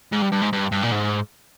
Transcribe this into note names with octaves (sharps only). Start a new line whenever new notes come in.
G#2
G2
G2
G#2
G2
G2
A#2
G#2